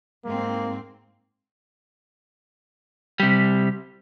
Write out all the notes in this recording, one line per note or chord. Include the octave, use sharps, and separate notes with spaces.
G#2 A#3 C4
C3 G3